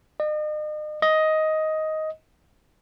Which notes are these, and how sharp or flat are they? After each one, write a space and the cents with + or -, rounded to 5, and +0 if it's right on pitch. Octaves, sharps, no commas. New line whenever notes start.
D#5 -40
D#5 +10